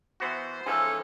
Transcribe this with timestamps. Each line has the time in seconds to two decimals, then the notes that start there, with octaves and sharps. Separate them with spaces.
0.20 E3 B3 F#4 C5
0.67 G#2 E3 F3 C#4 A4